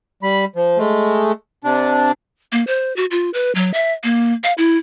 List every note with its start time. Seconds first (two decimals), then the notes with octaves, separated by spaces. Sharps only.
0.23 G3 B5
0.56 F3
0.78 G#3 A3
1.64 C3 D4
2.52 A#3
2.67 C5
2.96 F#4
3.11 F4
3.34 B4
3.55 F#3
3.74 E5
4.03 A#3
4.44 F5
4.58 E4